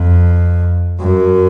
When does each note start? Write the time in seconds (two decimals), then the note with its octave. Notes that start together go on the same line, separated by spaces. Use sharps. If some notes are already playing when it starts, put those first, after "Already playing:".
Already playing: F2
1.00 F#2